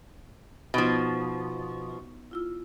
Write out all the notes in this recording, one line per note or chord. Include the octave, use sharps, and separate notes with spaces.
B2 F3 B3 D#4
E4 F4 E6